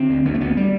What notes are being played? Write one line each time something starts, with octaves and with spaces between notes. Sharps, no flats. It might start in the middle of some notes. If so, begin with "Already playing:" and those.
Already playing: D3 C4
D2
D2 B3
A3
D2 B3
G3